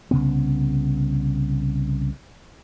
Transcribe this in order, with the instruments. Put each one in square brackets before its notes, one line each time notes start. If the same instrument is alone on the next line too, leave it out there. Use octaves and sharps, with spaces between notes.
[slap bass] C2 C#3 B3